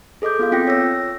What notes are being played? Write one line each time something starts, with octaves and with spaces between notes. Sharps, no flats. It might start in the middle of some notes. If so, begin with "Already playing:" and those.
G#4 A4 D#5 D6 G6
B3 F4 A4 F5
C4 F4 G5 A#6
C#5 E6 A#6